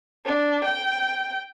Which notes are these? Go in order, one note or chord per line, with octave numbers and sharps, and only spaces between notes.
D4
G5